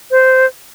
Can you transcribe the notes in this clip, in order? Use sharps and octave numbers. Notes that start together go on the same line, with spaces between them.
C5